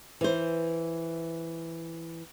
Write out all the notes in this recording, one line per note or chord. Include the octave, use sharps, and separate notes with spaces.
E3 C5